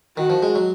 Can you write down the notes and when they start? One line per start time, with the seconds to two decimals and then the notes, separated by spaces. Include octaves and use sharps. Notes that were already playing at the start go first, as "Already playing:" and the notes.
0.17 D#3 F#4
0.30 F3
0.43 G#3
0.55 F#3